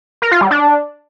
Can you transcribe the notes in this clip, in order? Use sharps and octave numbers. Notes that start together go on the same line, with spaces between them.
A#4
F4
G3
D4